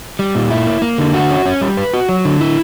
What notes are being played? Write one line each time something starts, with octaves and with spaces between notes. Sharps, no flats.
G3
A#2
E4
A#3
A#3
D3
F#4
C#4
C#4
G3
B4
F#4
F#3
D3
E4